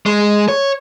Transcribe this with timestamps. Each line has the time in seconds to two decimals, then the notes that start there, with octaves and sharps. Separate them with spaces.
0.06 G#3
0.48 C#5